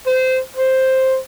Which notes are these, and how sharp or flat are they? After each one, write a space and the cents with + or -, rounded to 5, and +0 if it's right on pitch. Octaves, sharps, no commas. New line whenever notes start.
C5 -20
C5 +5